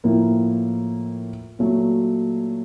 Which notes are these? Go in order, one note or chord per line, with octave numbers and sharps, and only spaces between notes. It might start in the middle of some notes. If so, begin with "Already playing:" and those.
A2 F3 A#3
A#2 F#3 A3